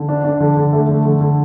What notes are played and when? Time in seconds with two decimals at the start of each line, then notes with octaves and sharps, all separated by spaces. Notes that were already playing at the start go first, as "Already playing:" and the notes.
Already playing: D3
0.09 D4
0.24 D4
0.40 D3
0.57 D3
0.73 A3
0.89 D3
1.05 D3
1.21 D3